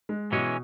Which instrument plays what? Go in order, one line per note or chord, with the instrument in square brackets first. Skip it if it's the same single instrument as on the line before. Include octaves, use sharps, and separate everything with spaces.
[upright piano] G#3
[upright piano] B2 [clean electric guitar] E3 G#3 C#4